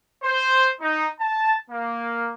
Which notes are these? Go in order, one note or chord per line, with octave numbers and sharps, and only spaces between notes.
C5
D#4
A5
A#3